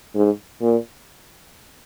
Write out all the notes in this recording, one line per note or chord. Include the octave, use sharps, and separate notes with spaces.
G#2
A#2